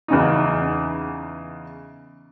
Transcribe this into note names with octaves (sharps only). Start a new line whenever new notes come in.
E2 C#3 D#4